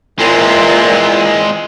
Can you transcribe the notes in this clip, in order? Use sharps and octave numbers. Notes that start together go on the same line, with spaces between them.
A#2 E3 G#3 C4